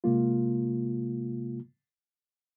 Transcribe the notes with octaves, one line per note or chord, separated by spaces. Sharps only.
C3 G#3 A#3 F4